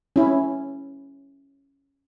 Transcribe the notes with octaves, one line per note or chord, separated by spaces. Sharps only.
C#4 E4